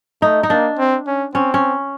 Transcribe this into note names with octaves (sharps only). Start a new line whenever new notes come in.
A3 D#4
D#4
A#3 D4
C4
C#4
C4 C#4
C#4